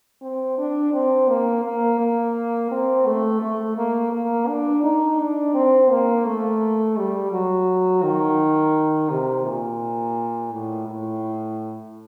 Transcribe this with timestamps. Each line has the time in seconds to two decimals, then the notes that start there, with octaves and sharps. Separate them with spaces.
0.22 C4
0.58 D4
0.93 C4
1.29 A#3
1.64 A#3
1.99 A#3
2.71 C4
3.06 A3
3.42 A3
3.77 A#3
4.13 A#3
4.48 D4
4.83 D#4
5.20 D4
5.54 C4
5.90 A#3
6.26 A3
6.97 G3
7.32 F#3
8.03 D#3
9.10 C3
9.45 A#2
10.52 A2
10.88 A2